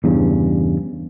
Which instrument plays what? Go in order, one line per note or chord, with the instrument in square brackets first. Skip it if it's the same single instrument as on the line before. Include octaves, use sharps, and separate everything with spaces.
[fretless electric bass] E2 G2 C#3